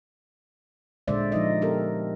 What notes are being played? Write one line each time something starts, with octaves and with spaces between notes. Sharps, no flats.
A#2 D3 G#3 C5 D5 E5
F3 D#4 D#5
B3 G4 A4 A#4